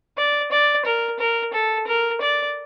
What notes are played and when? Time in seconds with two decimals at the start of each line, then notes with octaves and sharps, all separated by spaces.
0.18 D5
0.52 D5
0.85 A#4
1.19 A#4
1.53 A4
1.87 A#4
2.21 D5